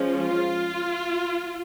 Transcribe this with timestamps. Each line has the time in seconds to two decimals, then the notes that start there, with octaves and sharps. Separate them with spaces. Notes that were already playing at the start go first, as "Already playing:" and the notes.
Already playing: F3 G#3 C#4
0.20 F4